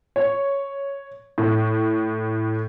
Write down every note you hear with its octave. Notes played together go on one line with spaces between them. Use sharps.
C#5
A2